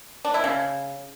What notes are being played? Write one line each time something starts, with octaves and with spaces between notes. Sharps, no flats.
D4
E4
C#3